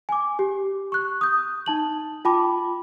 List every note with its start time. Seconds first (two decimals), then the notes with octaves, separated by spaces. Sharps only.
0.09 G#5 D6
0.39 G4
0.92 C#6 F#6
1.21 D#6 G6
1.66 D#4 A5 F#7
2.25 F4 G5 A5 B5 D6